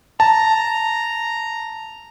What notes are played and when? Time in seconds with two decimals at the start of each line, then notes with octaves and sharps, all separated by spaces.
0.20 A5 A#5